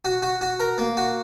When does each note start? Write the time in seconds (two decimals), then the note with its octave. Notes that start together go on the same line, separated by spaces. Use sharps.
0.05 F#4
0.22 F#4
0.41 F#4
0.60 A#4
0.78 A#3
0.97 F#4